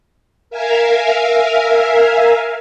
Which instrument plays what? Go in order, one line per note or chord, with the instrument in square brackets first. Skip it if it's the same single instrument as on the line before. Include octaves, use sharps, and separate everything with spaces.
[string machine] A#4 E5 F5 G#5